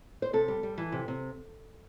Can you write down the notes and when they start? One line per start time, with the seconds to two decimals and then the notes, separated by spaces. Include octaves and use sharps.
0.22 C5
0.33 C3 A4
0.48 G3
0.63 G3
0.78 E3
0.92 C3
1.08 C3